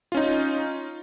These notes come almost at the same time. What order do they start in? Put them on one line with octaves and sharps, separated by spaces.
F4 C#4 D#4